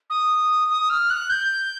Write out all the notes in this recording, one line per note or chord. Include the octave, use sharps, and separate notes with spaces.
D#6
D#6
F6
F#6
G6